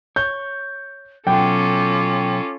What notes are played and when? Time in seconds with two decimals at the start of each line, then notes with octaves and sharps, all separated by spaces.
0.16 C#5 G6
1.27 B2 F#3 C#4 F4 A4 G5 D6